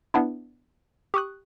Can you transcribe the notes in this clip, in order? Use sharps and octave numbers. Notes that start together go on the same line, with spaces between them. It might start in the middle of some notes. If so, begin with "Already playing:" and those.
B3 D4 E4
G4 C#6 D#6 F#6